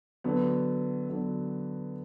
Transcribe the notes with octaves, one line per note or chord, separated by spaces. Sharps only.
D3 F#3 B3
D3 F#3 B3